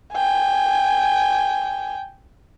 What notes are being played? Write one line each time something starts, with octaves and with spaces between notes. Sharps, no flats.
G5 G#5